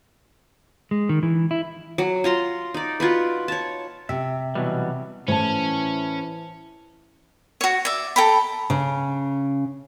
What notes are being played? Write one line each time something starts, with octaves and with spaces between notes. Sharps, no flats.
G#3
D#3
E3
E4
F#3
F4 A#5 C6
D#4 D5
F4 F#4 B4
C#5 A5
C3 E5
B2 E3 F#3 G3
A2 E3 C#4 C5 A5
F#4 C#5
D5 E5
A4 G5 A#5 B5
C#3